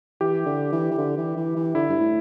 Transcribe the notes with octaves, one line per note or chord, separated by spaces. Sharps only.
E3 G4
D3
E3
E3
D3
E3
E3
E3
D3 E4
G2
A2